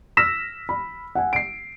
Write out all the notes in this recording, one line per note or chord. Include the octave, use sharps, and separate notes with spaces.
E6 F6 A#6 B6 E7
B5
F#5 G#5
C7 D7